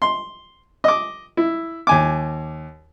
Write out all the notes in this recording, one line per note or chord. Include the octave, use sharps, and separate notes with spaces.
C6
D#5 D6
E4
D#2 G#5 D6